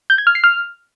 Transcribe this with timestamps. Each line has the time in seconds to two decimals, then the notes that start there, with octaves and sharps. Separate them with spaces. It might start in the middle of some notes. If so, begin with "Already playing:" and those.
0.10 G6
0.18 G#6
0.27 F6
0.35 C7
0.44 F6